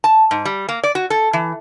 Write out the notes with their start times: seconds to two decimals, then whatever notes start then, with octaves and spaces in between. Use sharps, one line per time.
0.04 A5
0.31 G#2
0.45 G3
0.69 A#3
0.84 D5
0.95 F#4
1.10 A4
1.33 E3